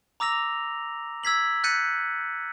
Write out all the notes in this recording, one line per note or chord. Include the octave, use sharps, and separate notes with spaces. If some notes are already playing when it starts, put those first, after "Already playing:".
A#5 D6 E6 A#6 F7
E6 G#6 B6 F#7
F#6 G6 A6 B6 C#7 D#7